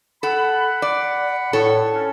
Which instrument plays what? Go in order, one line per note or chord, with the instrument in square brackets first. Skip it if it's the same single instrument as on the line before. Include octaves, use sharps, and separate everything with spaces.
[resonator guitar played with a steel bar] A4 [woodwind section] F#5 B5
[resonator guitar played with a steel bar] D5
[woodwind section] A2 [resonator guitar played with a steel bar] A4 C#5
[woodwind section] C#4 D4